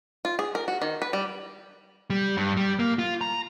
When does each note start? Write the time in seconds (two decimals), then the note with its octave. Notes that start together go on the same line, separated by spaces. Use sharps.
0.25 F4
0.39 G#4
0.55 A#4
0.68 F#4
0.82 D#3
1.02 B4
1.13 G3
2.10 G3
2.37 G2
2.57 G3
2.79 A#3
2.99 F4
3.21 A#5